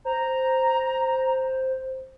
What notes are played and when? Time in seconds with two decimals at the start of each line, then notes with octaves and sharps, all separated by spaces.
0.05 C5 A#5